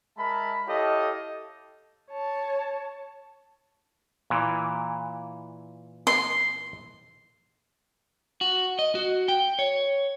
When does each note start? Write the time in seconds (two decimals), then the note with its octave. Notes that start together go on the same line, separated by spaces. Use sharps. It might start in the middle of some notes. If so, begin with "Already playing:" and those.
0.18 G#3 A#4 E5 A5 B5
0.67 E4 G4 A4 C#5 D#5 F5
2.11 C#5 A5
4.30 A#2 E3
6.07 C6
8.41 F#4
8.79 D#5
8.95 F#4
9.28 G5
9.59 C#5